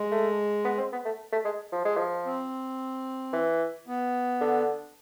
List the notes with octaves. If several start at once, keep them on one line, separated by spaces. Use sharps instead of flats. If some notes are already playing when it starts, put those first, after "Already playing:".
Already playing: G#3
A3
B3
C4
B3
A3
A3
G#3
F3
G#3
F3
C4
E3
B3
D3